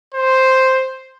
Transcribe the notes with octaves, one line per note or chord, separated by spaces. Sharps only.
C5